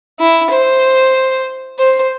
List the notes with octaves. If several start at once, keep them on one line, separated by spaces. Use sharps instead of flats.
E4
C5
C5